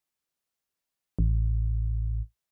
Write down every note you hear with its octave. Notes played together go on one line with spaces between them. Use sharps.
A1